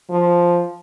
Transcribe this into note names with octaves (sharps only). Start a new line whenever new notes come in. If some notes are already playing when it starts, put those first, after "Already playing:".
F3